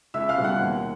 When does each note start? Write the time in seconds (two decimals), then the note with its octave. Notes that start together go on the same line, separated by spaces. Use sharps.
0.14 C#2 E5 E6
0.29 F5 F6
0.36 B2 G3 B3
0.44 F#5 F#6
0.59 D#2